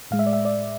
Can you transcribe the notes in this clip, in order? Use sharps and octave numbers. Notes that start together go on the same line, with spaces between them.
A2 G#3 F5
E5
D5
E5
D5